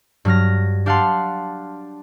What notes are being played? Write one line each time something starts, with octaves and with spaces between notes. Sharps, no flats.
G2 F#3 F6 A#6
D4 G4 F5 F#5 A5 C6